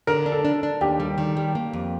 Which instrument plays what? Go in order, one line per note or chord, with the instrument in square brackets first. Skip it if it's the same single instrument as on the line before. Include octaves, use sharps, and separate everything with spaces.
[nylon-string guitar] D3 [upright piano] A#4
[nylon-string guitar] D4
[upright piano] A4
[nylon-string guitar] D4
D4
[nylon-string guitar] D#2 [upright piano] G4
[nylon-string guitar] G3
D#3
G3
A#3
F2